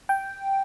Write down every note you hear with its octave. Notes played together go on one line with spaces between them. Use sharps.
G5